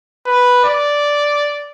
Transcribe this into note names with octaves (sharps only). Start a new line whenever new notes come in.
B4
D5